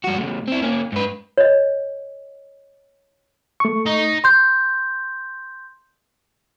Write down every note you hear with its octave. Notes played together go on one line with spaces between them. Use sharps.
G2 F#4
A2 C#3
C4 E4
A#3 C#4
G#2 B4
C#5 D#5
A3 C#6
D#4
C6 G6